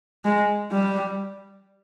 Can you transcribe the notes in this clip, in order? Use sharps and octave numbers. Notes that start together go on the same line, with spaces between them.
G#3
G3